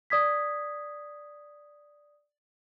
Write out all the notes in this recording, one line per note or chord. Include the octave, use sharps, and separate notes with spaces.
D5 D#6 G#6 B6